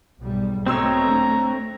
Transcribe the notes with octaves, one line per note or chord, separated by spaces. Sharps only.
B1 G#2 G3
B2 A3 C4 C#5 A#5 C6 E6
D3